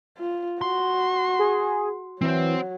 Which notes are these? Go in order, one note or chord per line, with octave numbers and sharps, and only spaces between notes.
F4
F#4 C6
G#4
E3 F#3 C4 C5